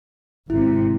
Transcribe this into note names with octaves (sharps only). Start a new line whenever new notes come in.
G#1 C3 E4